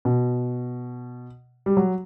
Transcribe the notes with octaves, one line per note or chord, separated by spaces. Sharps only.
B2
G3
F#3